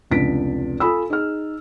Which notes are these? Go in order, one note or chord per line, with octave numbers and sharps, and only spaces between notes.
F1 C#2 D4 B6 D7
F4 A4 G#5 B5 D#6 E6
D#4 G#4 F6